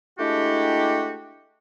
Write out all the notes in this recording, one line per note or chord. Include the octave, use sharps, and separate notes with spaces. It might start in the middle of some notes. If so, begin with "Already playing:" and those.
G#3 A3 D4 E4 F#4 G4